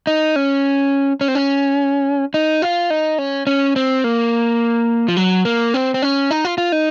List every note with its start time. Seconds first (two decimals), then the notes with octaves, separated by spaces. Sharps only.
0.07 D#4
0.36 C#4
1.21 C#4
1.28 C4
1.35 C#4
2.34 D#4
2.62 F4
2.90 D#4
3.18 C#4
3.47 C#4
3.76 C4
4.04 A#3
5.08 F3
5.17 F#3
5.45 A#3
5.74 C4
5.94 C4
6.02 C#4
6.31 D#4
6.45 F4
6.58 F4
6.72 D#4